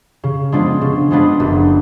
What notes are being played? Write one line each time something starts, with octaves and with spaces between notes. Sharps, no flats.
C#3
F3 G#3 B3 D4
C#3
F3 G#3 B3 D4
F#1